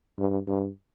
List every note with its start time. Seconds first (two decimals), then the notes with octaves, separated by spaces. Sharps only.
0.18 G2
0.47 G2